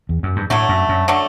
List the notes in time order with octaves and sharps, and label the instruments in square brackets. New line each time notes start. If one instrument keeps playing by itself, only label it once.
[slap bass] E2
F#2
G2
[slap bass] A2 [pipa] D3 F#3 A3
[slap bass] F#2
F#2
[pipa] D3 F#3 A3